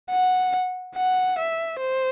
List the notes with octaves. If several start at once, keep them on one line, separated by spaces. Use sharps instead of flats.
F#5
F#5
E5
C5